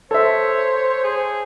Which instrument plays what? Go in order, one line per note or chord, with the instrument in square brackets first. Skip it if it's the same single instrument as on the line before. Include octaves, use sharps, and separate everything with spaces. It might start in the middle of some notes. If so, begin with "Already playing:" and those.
[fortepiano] A4 E5 [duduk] C5 [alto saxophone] C#5
[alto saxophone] G#4